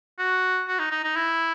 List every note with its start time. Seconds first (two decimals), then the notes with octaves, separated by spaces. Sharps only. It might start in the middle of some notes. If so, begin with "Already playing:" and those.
0.19 F#4
0.68 F#4
0.79 D#4
0.91 D#4
1.04 D#4
1.16 E4